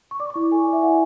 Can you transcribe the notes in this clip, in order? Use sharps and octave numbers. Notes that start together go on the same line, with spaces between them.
C#6
D5 D6
C#6
E4
A4 G#5
G#5
D5
E5
E4 F#5